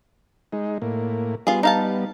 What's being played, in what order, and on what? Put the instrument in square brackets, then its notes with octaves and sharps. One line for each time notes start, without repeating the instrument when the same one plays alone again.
[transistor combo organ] G#3 D#4
A2 A#3
[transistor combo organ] G3 B3 [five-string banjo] F4 G#4
[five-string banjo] D#4 F5 A5